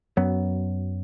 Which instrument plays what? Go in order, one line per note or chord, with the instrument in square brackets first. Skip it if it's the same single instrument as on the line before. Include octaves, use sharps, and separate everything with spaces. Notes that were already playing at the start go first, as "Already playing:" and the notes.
[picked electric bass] F#2 F#3 B3